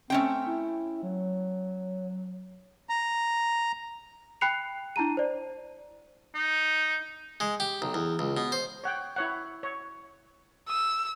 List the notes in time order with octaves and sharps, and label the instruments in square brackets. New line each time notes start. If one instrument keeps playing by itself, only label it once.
[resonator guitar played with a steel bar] A3 C#4 G5 [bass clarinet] C4
[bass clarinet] E4
F#3
[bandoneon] A#5
[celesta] G5 B5 F#6 C7 C#7 F7
D4 E4 A5 A#5 D#7
C5 D5
[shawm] D#4
[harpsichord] G#3
G4
B1
E2
C#2
B2
C5
[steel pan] C#5 F#5 G5
E4 C#5 F#5
C#5
[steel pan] D#6 [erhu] E6